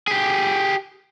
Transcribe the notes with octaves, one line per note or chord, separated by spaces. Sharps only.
G4 G#4